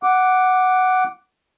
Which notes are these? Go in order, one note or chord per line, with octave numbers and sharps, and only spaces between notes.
F#5 D6